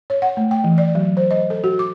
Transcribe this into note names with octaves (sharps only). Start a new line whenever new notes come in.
C#5
F#5
A3
G5
E3
D5
F#3
C5
D#5
A4
F#4
D6